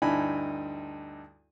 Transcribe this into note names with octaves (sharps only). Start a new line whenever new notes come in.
D2 G2 D#4 E4 G#5 B5